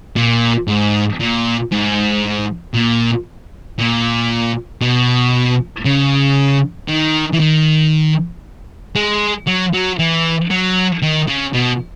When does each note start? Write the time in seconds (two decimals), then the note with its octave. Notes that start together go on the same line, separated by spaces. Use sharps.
0.16 A#2
0.68 G#2
1.20 A#2
1.72 G#2
2.74 A#2
3.79 A#2
4.81 B2
5.85 C#3
6.88 D#3
7.33 E3
7.40 D#3
8.96 G#3
9.47 F#3
9.73 F#3
9.99 E3
10.50 F#3
11.02 D#3
11.28 C#3
11.54 B2